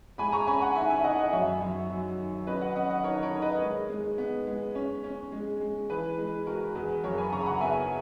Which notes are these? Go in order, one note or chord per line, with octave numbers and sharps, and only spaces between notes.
G#3 G#5 B5
A#5 C#6
C#4 G#5 B5
F#5 A#5
D#3 E5 G#5
E5 G#5
D#3 D#5 F#5
D#5 F#5
F#2 C#5 E5
F#2
F#3
D#3
C#4 B4 D#5
D#5 F#5
C#4 D#5 F#5
D#5 F#5
D#3 A#4 C#5
A#4 C#5
D#3
B4 D#5
G#3
G#3
B3
G#3
C#4
C#4
G#3
G#3
E3 G#4 B4
G#3
G#3 F#4 A#4
E2 G#4 B4
F#2 A#4 C#5
G#5 B5
C#3 A#5 C#6
B5
F#5 A#5
B3 E5 G#5